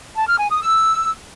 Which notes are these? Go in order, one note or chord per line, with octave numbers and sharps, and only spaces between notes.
A5
F6
G#5
D#6
E6